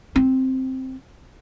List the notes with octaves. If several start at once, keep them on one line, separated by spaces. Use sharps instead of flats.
C4